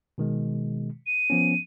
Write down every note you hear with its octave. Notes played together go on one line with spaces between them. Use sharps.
B2 D#3 G#3
D#7
F3 B3 C#4